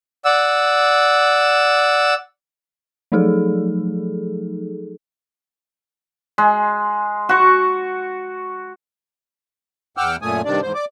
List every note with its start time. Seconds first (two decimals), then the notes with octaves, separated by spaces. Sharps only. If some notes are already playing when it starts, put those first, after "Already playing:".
0.25 D5 F#5 E6
3.12 F3 F#3 A3 D#4 G#4 A4
6.38 G#3
7.29 F#4 C#6
9.97 E2 F#5 G5 D6 E6 F6
10.22 F#2 A#2 A3 G#5 D#6
10.45 G2 C3 D#3 D4 D5
10.62 E2 G#2 C5
10.74 D5 D6